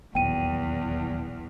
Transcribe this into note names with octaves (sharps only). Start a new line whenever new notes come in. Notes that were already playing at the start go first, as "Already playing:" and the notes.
D#1 B1 E2 B2 G5 D#7